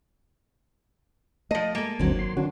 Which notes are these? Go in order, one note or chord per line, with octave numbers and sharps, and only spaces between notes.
F3 A3 D#5
G#3 A#3 A4
G1 D2 D3 D#3 F#3 C4
C6
D3 E3 C#4 D4 F#4